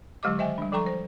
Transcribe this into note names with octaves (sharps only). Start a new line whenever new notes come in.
D3 F#3 G#3 G4 D#5 D6
D#3 C5 D#5 E5 G5 G#5
G3 D4
F3 A4 G5 A#5 C#6
C5